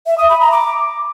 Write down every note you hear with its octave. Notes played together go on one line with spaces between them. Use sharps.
E5
D#6
B5
A#5
D6